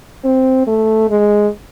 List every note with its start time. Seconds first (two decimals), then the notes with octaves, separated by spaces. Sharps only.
0.25 C4
0.67 A3
1.09 G#3